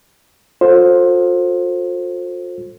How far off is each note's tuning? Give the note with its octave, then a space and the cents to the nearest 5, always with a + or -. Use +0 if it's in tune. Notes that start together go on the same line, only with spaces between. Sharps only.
F4 +45 A4 +20 C5 +15